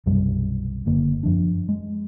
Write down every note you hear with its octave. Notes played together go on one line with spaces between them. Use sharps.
B1 F#2 C3 G3
F#1 D3 A#3
F#2 F3 D4
G#3